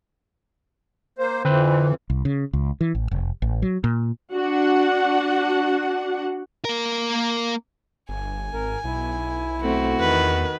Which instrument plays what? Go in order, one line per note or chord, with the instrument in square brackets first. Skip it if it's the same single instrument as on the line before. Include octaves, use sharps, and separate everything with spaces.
[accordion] A#3 C5
[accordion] F2 E3 [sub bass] D3 [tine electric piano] C4 B4 C5
[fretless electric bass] C2
C#3
C#2
E3
A1
F1
A1
F#3
A#2
[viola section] D4 F#4 F#5
[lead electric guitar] A#3 A#4
[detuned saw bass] G1 [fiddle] G#5
[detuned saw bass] G#1 [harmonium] A#4
[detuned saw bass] B1 [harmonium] E4
[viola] A3 C4 [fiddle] F#4
[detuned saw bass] E2 [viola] D#3 B4